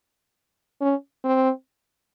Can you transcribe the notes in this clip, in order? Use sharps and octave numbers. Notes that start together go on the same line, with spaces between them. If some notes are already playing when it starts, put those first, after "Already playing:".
C#4
C4